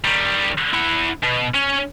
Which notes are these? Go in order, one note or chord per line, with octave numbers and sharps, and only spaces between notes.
D#3 G3
E4 F#5
B2
C#4